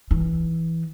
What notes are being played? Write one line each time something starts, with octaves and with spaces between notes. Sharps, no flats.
E3